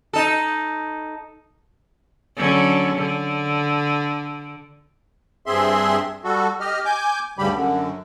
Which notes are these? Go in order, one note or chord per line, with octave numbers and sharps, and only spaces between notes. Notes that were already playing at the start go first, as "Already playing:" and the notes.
D#4 A4
D3 F#3 C#4
D3
G2 C4 G#4 E5 C6
G3 F#4 A4
G4 D#5 F6
G#5 D6 G6
D2 G2 C#3 G3 G4 B5
F#2 D3